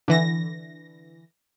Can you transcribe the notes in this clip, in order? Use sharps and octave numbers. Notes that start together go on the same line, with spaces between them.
D3 E3 A#6